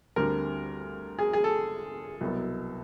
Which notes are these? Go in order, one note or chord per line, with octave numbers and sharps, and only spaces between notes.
D2 D3 G3 C4 A#4
G#4
G#4
A4
C2 B2 F#3 B3